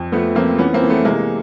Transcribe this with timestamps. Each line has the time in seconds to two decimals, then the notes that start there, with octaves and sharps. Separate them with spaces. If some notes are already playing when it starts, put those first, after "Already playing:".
Already playing: F2
0.12 F3 A3 B3
0.35 F3 A#3 C4
0.58 E3 B3 C#4
0.74 A#3 C4
0.82 E3
0.90 A3 B3
1.05 C3 G#3 A#3